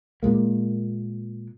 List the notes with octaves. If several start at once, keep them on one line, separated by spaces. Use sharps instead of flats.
A#2 G#3 A#3